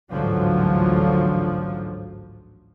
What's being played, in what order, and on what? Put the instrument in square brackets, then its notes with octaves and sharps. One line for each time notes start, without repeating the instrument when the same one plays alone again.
[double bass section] A1 D2 G#2 D3 F3 F#3